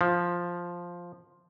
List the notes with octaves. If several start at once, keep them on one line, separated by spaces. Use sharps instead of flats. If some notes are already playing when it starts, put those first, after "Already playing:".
F3